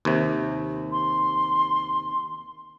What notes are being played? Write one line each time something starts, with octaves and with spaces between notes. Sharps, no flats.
D#2 C3
C6